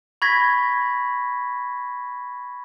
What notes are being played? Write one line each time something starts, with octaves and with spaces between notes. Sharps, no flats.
B5 C#6 G#6 A#6 B6